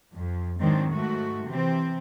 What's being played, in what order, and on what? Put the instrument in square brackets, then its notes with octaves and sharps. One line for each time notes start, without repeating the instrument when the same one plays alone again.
[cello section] F2
G#2 D#3 F#3 C4 D4
G#2 A3 F#4
C3 E3 C4